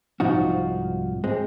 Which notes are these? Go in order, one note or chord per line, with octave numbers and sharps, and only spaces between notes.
C2 G#2 F3 D#4 F4 F#4
G#3 C4